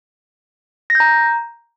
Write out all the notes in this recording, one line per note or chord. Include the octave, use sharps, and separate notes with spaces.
A#6
G6
A#5